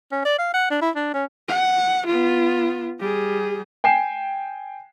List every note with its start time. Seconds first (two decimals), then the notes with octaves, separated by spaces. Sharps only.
0.12 C#4
0.25 D5
0.39 F5
0.54 F#5
0.71 D4
0.82 E4
0.96 D4
1.14 C#4
1.49 F#5
2.06 B3 F4
3.00 G3 G#4
3.84 G5 G#5 C7 E7